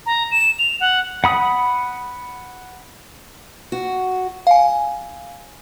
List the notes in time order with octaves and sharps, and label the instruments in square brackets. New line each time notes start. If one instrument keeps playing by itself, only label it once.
[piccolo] A#5
E7
F7
F#5
[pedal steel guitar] F#5 B5 D#6
[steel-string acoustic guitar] F#4
[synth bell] F5 G#5